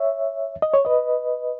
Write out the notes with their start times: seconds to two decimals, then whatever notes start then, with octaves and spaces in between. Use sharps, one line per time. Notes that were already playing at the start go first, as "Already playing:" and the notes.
Already playing: C#5 E5
0.62 D#5
0.74 C#5
0.85 B4 D#5